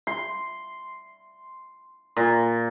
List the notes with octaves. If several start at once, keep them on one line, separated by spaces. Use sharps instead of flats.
C6
A#2